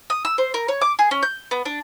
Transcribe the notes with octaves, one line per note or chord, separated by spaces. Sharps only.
D#6
E6
C5
A#4
C#5
D6
G#4
C#4
G6
B3
D4